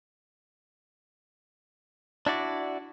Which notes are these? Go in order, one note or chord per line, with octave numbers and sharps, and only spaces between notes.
D4 E4 F#4 D5